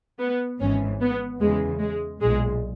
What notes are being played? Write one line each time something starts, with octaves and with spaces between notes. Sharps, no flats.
B3
G#1 G#2 E3 C#4
B3
E2 C#3 E3 G#3
G#3
B1 A#2 G#3